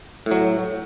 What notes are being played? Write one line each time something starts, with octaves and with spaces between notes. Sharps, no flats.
A2 F#3